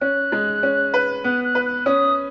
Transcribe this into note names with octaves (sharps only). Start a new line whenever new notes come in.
C#4 F#6
G#3
C#4
B4
B3 F#6
F#6
B4
F#6
C#4 D#6